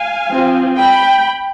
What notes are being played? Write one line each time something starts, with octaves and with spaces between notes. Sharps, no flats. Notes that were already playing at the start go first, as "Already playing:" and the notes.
Already playing: F5 G#5
F3 C4 F4
G5 B5